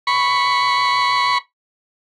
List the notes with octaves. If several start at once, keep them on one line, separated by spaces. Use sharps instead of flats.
B5 C#6